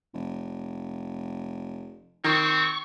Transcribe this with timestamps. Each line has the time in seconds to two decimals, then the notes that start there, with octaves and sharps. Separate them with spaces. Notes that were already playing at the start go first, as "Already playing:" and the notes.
0.14 F1
2.24 D#3 C4 C#6